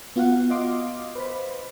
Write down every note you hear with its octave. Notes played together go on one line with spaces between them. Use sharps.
B3 F4 F#4 F5 F#5
D#5 F5 C6 D6
B4 C5 B5